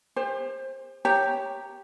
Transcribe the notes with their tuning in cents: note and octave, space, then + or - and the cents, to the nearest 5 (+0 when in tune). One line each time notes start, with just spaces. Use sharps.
G4 +45 C5 +20
G4 +0 C#5 +0 A#5 -10